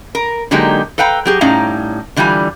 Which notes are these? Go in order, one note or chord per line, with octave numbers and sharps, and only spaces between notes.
A#4
D3 F#3 G#3 A#3 D#4 G4
A4 B4 F5 G5 A#5
F#3 G4 G#4
A2 G3 C#4 D#4 F5 A#5
D3 E3 G3 F4 G#5